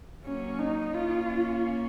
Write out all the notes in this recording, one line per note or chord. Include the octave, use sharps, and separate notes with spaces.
F#3 A#3 C#4
D#4
A#3 C#4 F4